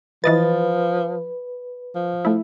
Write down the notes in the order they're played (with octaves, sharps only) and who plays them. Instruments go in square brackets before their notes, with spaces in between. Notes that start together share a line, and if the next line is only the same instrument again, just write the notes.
[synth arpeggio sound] E3 D#5 A6 [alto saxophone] F3 [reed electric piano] B4
[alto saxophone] F3
[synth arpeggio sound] A3 E4